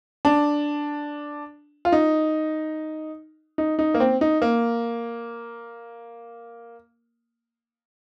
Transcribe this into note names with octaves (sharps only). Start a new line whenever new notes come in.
D4
F4
D#4
D#4
D#4
A#3
C4
D#4
A#3